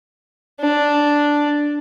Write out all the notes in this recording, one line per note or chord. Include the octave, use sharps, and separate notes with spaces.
D4